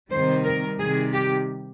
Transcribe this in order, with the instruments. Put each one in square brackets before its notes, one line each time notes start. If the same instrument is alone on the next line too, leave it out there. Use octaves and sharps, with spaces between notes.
[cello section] C3 D#3 G3 C5
A#4
C3 D#3 G3 G#4
G4